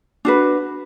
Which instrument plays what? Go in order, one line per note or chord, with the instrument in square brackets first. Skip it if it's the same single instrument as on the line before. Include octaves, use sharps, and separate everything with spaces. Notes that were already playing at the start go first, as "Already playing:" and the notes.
[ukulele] D4 F#4 B4